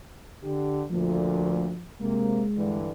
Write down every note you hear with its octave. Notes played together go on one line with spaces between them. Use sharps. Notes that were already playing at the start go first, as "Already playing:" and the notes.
D3 G4
D2 A#2 F3 A3
C3 G#3 A#3
G2 D3 E3